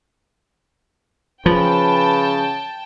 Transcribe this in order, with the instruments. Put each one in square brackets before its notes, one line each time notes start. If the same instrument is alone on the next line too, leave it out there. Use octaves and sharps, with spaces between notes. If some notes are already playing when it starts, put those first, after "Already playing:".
[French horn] C#3 [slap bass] F3 [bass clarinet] B4 [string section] G5 A5